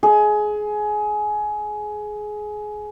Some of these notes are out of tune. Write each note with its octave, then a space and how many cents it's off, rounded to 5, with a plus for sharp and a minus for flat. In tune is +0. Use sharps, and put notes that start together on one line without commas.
G#4 +20